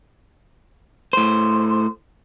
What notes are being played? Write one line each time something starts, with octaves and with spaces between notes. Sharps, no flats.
A2 C5